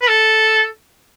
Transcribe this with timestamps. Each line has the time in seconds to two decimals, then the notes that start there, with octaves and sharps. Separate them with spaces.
0.01 B4
0.08 A4